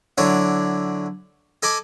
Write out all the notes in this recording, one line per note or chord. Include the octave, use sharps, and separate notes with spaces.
D3 F#3 D4 E4 C#5 D5
A4 D#5 G#5 A5 B5 D6